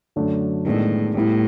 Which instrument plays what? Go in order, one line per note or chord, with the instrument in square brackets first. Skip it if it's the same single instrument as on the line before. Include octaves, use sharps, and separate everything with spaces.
[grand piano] F#2 D3 F#3 A3 D4
[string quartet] A2 [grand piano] D#3 G#3 B3 D4
[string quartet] A2 [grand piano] G3 B3 E4